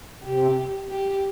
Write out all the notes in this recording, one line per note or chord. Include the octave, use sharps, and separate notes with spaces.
C3 G4
G4